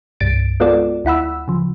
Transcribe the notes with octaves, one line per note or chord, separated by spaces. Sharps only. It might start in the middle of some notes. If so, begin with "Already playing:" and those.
C2 G2 A6 D7
G#3 B3 F4 F#4 A4 D5
D2 E4 F#5 B5 E6
C#3 F3